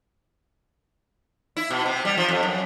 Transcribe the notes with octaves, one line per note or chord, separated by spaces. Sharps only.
E4
B2
C3
G3
F3
F2
F#2